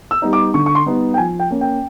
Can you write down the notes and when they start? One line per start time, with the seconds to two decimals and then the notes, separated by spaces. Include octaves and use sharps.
0.11 E6
0.22 G3 B3 D#4
0.33 D6
0.54 D3 C#6
0.66 C#6
0.75 C6
0.86 G3 B3 D#4
1.14 G5
1.18 F3 G#5
1.40 G5
1.51 A#3 C#4
1.61 G5